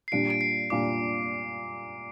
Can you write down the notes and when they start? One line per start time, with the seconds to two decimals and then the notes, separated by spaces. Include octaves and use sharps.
0.08 C7
0.12 A#2 G3 D4 F4 D7
0.30 D7
0.41 C7
0.70 A#2 G3 D4 F4 D6